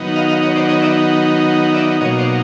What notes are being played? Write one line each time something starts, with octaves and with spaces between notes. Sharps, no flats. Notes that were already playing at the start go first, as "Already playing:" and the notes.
Already playing: D#3 F#3 B3 D#4
D#5 F5
D#5 F5
C#5 D#5
C5 D5
C#5 D#5
D5 E5
D5 E5
B2 F#3 A#3 D#4 C#5 D#5
C5 D5